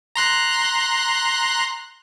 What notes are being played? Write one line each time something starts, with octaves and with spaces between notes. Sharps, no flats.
A#5 C6 F#6